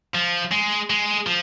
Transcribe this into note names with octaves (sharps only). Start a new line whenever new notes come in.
F3
G#3
G#3
F3